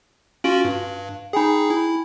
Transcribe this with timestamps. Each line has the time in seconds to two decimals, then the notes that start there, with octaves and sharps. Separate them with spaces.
0.44 C#4 F4 F#4 F5 D7 F#7
0.65 G2
1.33 D#4 G#4 G5 G#5 B5
1.70 E4